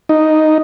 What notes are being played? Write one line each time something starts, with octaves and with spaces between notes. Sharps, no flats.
D#4